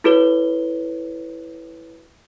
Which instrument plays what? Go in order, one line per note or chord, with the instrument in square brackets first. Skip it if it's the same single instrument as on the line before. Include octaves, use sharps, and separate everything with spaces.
[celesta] E4 F#4 A4 B4 C#5 G7